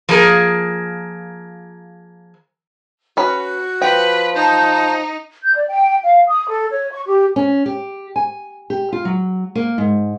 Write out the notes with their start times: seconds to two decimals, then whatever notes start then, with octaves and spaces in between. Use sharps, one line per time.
0.09 F3 A#3 G#4 A#4
3.17 C#4 F#4 B4
3.82 F3 B4 G5
4.36 D#4 A5 G6
5.45 G6
5.56 D5
5.68 G5
6.03 F5
6.28 D#6
6.48 A4
6.71 C#5
6.92 C#6
7.07 G4
7.36 C#4
7.66 G4
8.16 G#5
8.70 G4
8.92 F4
9.05 F#3
9.55 A#3
9.78 G#2